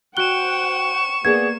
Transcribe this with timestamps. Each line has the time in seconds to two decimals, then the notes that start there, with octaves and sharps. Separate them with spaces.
0.17 F#4 C5 F#5 G5 C#6 F#6 E7 G7
1.25 A#3 B3 G#4 D5 G#6